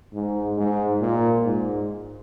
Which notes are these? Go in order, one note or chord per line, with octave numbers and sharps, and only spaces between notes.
G#2
G#2
A#2
G#2